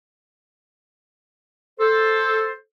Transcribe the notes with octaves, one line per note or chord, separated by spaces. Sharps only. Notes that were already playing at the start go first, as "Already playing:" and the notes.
A4 C5